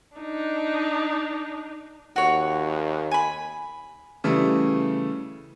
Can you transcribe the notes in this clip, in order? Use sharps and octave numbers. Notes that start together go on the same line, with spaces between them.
D4 D#4
D#2 F#4 C#5
G#5 B5
C#3 E3 G3 A3